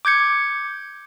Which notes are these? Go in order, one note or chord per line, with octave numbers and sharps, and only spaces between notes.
D6 G6 G#6 C#7